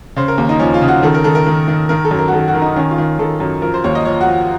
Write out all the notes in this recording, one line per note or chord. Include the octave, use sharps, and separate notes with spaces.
C#3 C5
A#4
D#2
D#4
F3 C#4
F4
C#3
F#4
D#3 A4
A#4
D#3 A4
A#4
D#3
D#3
D#3 A#4
A4
F#2
A#4
F#4
D#3 A4
F#4
D#3
D#4
D#3 C#4
F4
D#3
D#3 A4
F#2
F3 A#4
C5
D#2 C#5
D#5
F3 C#5
F#4
F3